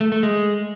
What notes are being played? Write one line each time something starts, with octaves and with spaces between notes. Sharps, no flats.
A3
A3
G#3